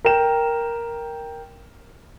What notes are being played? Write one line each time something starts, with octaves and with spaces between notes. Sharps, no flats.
A#4 G5 E7